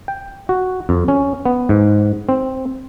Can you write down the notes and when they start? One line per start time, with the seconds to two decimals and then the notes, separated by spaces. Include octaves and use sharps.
0.08 G5
0.49 F#4
0.89 F2
1.08 C#4
1.46 B3
1.69 G#2
2.29 C4